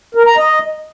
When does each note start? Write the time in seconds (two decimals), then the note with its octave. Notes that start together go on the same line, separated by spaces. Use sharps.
0.15 A#4
0.26 A#5
0.37 D#5